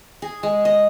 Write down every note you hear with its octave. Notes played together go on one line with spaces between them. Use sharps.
G#4
G#3
D#5